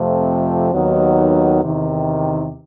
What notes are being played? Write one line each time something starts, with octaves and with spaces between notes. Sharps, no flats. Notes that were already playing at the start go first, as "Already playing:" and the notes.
Already playing: F2 C3 F3 A3 C4
D#2 D#3 F#3 B3 D#4
E2 C3 D#3